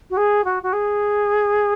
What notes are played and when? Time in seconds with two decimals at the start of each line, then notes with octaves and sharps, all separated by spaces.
0.10 F#4
0.17 G#4
0.44 F#4
0.63 F#4
0.73 G#4